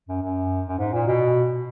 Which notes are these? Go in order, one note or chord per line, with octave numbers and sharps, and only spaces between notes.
F#2
F#2
F#2
G#2
A#2
B2